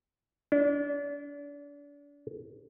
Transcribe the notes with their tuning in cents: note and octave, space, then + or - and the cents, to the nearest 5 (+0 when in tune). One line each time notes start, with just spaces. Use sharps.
D4 -35